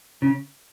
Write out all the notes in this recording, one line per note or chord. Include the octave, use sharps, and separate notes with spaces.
C#3